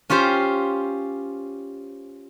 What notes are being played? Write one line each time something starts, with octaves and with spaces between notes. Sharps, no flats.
C#4 F4 G4 C5